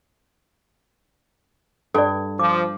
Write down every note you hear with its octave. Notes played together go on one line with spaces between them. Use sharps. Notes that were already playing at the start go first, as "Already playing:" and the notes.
G2 A4 D5
F3 D6